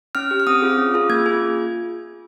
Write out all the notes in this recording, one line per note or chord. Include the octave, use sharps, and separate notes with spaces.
C#4 F6
G4
F6
C4 D#6
F4 G#4
C#4
F4 G#4
A#3 G#6
F4 G#4